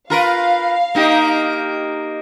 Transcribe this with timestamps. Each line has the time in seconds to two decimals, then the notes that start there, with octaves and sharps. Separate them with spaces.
0.10 F4 A#4 B4 F5
0.95 A#3 D#4 G4